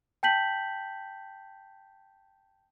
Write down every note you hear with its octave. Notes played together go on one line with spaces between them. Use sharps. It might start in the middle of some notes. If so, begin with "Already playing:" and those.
G5 A5 G6 B6 F#7